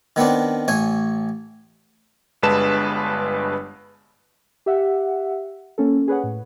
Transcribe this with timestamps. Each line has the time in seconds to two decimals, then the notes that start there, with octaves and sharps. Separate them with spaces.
0.16 D#3 B3 C4 D4
0.68 A1 C#5 G#5
2.43 G1 G2 G#3 B4 A5 E7
4.66 G4 E5 F#5
5.78 A#3 C#4 A4
6.08 G#4 B4 C#5 F#5
6.24 A2